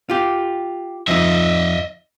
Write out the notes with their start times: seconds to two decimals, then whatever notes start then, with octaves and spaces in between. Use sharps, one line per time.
0.10 F4 G4
1.08 F2 F3 D#4 D#5 E5